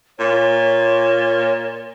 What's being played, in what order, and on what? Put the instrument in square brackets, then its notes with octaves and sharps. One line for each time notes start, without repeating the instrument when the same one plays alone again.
[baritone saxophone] A#2 [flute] C#5